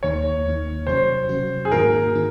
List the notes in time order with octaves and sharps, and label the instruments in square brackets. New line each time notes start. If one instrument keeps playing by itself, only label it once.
[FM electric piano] D#2 D#3 A#3 D#4 [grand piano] C#5
[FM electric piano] D#2 D#3 A#3 D#4
[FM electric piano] C3 F#3 C#4 F#4 [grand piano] C5
[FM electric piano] C3 F#3 C#4 F#4
[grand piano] G#4
[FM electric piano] G#2 D#3 A#3 D#4 F#4 [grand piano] A#4
[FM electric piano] D#3 A#3 D#4